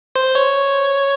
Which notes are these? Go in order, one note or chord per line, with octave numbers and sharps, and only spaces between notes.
C5
C#5